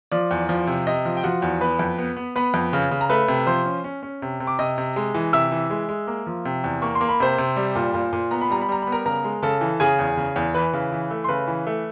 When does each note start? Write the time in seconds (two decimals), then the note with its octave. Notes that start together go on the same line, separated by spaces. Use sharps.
0.12 F3 D5
0.31 E2
0.49 F3
0.67 C3
0.87 C3 D#5
1.05 F3
1.17 G5
1.23 F3 F#4 F#5
1.42 E2
1.61 B3 B4 B5
1.79 F2
1.98 B3
2.17 B3
2.36 B3 B4 B5
2.54 F2
2.73 C#3
2.91 C#3
3.01 A#5
3.10 A3 B4 B5
3.28 C3
3.47 F3 C5 C6
3.66 C#4
3.84 C#4
4.03 C#4
4.22 C3
4.40 C3
4.47 D6
4.59 C3 D#5 D#6
4.78 C3
4.96 G#3
5.14 E3
5.33 C3 E5 E6
5.52 E3
5.70 G#3
5.89 G#3
6.07 A#3
6.27 F3
6.45 C3
6.64 E2
6.82 A#3 C#6
6.95 C6
7.01 A#3
7.09 B5
7.20 C3 C5 C6
7.38 C3
7.56 G3
7.75 A#2
7.94 A#2
8.13 A#2
8.31 B3 A#5
8.41 B5
8.50 G3 A#5
8.62 B5
8.69 G3 A#5
8.82 B3 B5
8.92 A#4 A#5
9.06 C#3 A#4 A#5
9.24 G#3
9.43 C#3 A4 A5
9.61 E3
9.80 C#3 G#4 G#5
9.99 E2
10.17 C#3
10.36 E2
10.54 E3 B4 B5
10.73 C#3
10.92 E3
11.11 A3
11.24 C6
11.29 C#3 B4 B5
11.47 E3
11.67 A3